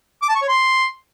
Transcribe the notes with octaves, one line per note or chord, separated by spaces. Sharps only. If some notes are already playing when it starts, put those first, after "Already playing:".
D6
A5
C#6
C#5
C6